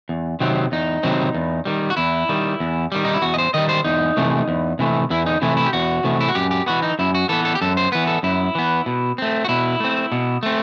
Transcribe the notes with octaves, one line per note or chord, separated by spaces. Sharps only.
E2
C3 D#3 F#3 C4
E2 D#4
C3 D#3 F#3 C4
E2
D#3 G3
F#4
E2 E4
D#3 G3
E2
D#3 G3
D#4
E4
E2 F#4
D#5
C5
D#3 G3 D#5
C5
E2 D#4
C3 E3 A3
E2
C3 E3 A3
E2 E4
D#4
C3 E3 A3 E4
E4
G4
E2 F#4
C3 E3 A3
E4
F#4
F#2 G4
G4
E3 B3 F#4
D#4
F#2 E4
F#4
E3 B3 A4
A4
G4
F#2 A4
C5
E3 B3 B4
A4
F#2 E4
E3 B3
B2
A3 C4
F#4
B2 E4
A3 C4
B2
A3 C4